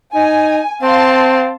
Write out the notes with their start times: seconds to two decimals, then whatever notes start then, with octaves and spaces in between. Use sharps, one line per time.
0.15 D#4 G#5
0.82 C4 F5 A5 C6